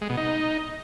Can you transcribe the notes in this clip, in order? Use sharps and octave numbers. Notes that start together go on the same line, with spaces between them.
G#3
B2
D#4